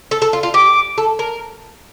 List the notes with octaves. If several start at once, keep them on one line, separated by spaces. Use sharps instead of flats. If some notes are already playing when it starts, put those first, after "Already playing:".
A4
A4
F4
F4
G4 D6
A4
A#4